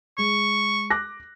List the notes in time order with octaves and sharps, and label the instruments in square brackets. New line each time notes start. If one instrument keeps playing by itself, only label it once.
[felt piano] G#3 [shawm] C#6
[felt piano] D6 F#6 A#6